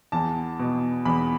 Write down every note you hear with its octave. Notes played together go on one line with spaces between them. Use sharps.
E2 A5
B2
E2 B5